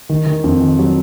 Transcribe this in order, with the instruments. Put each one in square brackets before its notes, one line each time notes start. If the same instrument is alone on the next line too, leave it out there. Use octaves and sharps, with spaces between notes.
[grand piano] D#3
D#3
F2
D#3
F#3